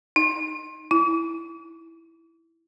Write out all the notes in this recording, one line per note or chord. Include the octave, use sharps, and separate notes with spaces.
D#4
E4